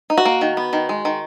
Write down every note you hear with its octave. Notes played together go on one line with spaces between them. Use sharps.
D#4
F#4
A#3
D#3
B3
D#3
G#3
D#3